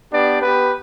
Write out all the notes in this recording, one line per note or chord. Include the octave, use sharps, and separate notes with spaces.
B3 D4 G4 D5
B3 G4 B4